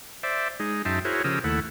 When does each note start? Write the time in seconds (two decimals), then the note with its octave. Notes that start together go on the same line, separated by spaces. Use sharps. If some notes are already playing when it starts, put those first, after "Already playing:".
0.23 C5 D5 E5
0.60 G#3 D#4
0.85 F#2 D#4 E5 G5 A5 C6
1.05 E4 F#4 G#4 A#4 C5 C#5
1.24 C#3 F3 G4 A#4 D#6 E6
1.44 D#2 A3 E4 F#5